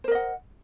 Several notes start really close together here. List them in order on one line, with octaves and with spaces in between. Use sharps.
C5 A#4 D#5 F#5